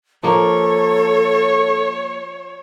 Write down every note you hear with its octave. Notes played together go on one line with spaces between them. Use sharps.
F3 A#3 A4 C#5